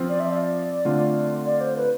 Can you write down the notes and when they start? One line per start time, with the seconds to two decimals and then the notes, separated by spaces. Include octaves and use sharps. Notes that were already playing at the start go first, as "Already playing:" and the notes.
Already playing: F3 C4 F4
0.09 D5
0.20 E5
0.30 D5
0.85 D3 A3 C4 F4
1.46 D5
1.61 C5
1.77 B4